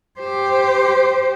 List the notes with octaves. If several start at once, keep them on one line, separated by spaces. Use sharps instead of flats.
G4 C5